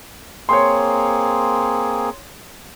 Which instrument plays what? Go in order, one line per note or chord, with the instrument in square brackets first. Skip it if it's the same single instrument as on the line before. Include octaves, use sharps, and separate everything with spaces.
[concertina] A#3 C4 G#4 [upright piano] C#5 C6